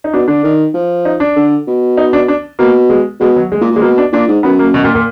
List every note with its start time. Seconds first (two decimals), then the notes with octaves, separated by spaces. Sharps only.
0.04 D#4
0.13 B2 D4
0.28 D3 D4
0.44 D#3
0.74 F3
1.05 D#4
1.20 D4
1.36 D3
1.67 B2
1.97 D#4
2.13 D4
2.28 D4
2.59 B2 A#3
2.90 G#3
3.20 B2 G#3
3.36 F#3
3.52 G#3
3.61 A#2
3.71 A#2
3.76 G#3
3.81 B2 A#3
3.98 D4
4.13 A#2 D4
4.28 G#2
4.43 F#2 B3
4.59 A#3
4.74 B2
4.84 A#2
4.95 A#2